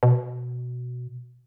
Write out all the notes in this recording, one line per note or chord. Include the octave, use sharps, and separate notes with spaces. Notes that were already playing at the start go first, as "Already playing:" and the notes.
B2